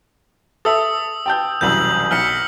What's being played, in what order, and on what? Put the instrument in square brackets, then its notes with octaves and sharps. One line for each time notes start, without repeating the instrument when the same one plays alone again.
[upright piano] A4 E5 [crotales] D#6 E6
[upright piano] G5 A5 G6
[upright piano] E1 C2 F#2 [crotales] G6 F#7
[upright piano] B1 [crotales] F6 B6 C#7